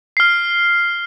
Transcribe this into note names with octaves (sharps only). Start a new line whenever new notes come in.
F6 C7